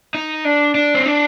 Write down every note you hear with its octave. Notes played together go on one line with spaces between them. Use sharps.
D#4
D4
D4
C4
D4